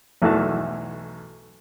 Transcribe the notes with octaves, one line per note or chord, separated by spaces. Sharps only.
B1 E2 E3 A3 F#4 A5